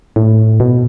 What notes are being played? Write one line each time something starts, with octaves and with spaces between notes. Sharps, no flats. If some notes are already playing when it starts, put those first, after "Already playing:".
A2
B2